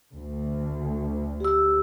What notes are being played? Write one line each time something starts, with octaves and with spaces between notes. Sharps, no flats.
D2
G4 E6